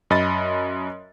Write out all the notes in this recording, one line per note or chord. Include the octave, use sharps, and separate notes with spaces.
F#2 D#5 B5 A6